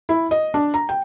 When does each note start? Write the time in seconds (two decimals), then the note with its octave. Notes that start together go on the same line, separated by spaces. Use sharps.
0.09 E4
0.31 D#5
0.54 D4
0.74 A#5
0.89 G5